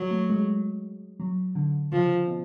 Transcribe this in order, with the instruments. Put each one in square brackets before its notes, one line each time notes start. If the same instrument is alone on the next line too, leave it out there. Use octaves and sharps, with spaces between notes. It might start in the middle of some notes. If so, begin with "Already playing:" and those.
Already playing: [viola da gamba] F#3
[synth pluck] A3
G#3
F#3
D3
[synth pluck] C#3 [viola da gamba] F3
[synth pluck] B2